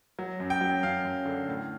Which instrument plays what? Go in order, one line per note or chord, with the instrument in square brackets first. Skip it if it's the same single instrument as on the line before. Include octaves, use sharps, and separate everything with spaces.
[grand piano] F#3
F#2
G5
F#3
F#2 F5
F#2
D3
A2